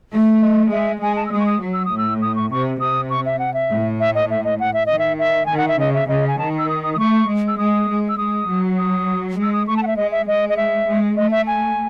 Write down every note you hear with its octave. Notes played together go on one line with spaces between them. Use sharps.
A3
D#5
G#3 E5
G#3 G#5
A5
E6
G#3 D#6
C#6
D#6
F#3
E6
D#6
A2
E6
D#6
C#6
C3 C#6
C3 D#6
C#6
E5
F#5
E5
A2
E5
D#5
E5
D#5
F#5
E5
D#3 D#5
E5
E5
D#3 G#5
F#5
E5
C#3 D#5
E5
C#3 D#5
G#5
D#3 A5
E6
D#6
D#6
D#6
A3 C#6
G#3
E6
G#3 D#6
G#3
E6
G#3 D#6
F#3
D#6
G#3 E6
D#6
A3 C#6
A5
F#5
E5
G#3 D#5
E5
G#3 D#5
D#5
E5
G#3
A3 D#5
E5
G#5